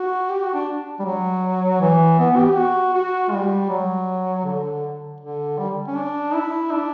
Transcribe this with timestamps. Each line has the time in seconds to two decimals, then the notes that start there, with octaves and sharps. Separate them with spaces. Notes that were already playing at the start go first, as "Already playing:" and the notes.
Already playing: F#4
0.29 G4
0.42 F#4
0.54 D4
0.99 G3
1.05 F#3
1.81 E3
2.19 B3
2.37 G4
2.56 F#4
2.94 F#4
3.32 G3
3.69 F#3
4.45 D3
5.20 D3
5.59 G3
5.87 C#4
5.96 D4
6.34 E4
6.71 D4